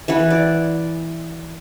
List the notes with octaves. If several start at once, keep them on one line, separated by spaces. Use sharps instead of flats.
E3 B4 F#5
D5